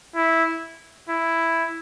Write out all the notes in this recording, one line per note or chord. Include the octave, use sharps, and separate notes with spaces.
E4
E4